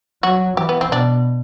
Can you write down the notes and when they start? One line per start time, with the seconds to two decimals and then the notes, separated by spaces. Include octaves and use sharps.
0.23 F#3 F#4
0.57 E3 G4
0.69 B3
0.81 C4
0.91 B2 D4